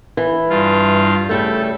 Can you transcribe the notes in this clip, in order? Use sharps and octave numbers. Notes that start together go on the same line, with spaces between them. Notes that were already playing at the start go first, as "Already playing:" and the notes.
E3
G2 F4
C#3 G3 A3 A4